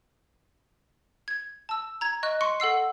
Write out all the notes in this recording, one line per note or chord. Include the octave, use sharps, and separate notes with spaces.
G#6
A5 E6
A#5 G#6
D#5 C#6 F#6
C6 C#6 C#7
A4 F#5 E6 C7